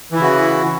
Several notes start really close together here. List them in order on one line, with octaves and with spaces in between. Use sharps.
E3 E4 C#3 F#4